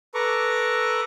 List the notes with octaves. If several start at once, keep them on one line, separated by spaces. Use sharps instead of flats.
A4 B4 A#5 C#6 D6